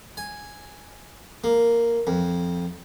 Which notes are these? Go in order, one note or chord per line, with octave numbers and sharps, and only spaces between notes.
G#5
A#3
F2